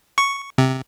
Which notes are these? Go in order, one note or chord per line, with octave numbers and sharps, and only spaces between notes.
C#6
C3